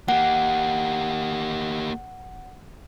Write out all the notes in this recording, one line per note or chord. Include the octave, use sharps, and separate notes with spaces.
A#3 G4 F#5